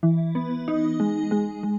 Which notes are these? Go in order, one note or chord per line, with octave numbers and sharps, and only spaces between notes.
E3
B3
D#4
G#3
G#3
G#3